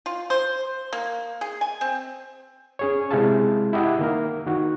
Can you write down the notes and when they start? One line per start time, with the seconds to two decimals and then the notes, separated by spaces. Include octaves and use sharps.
0.06 F4
0.30 C5
0.93 A#3
1.41 G#4
1.61 G#5
1.81 C4
2.79 C#4 G#4 C#5
3.11 C3 G#3 E4 G#4 F5 A5
3.73 E4 G4 D#5 F#5
3.99 D#3 A#3 A#4
4.46 D#3 F#4